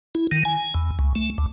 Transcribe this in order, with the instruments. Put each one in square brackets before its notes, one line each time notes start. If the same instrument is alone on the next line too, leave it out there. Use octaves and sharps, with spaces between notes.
[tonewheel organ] E4
D#3
G#5
E2
C#2
A3
D2